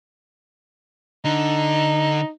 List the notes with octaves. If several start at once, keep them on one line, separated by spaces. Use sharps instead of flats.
D3 D#4